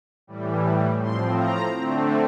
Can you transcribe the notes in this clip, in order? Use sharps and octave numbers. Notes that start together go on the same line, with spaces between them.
A2 E3 G3
A2 F3 C4 C6
A#5
D3 A3 C4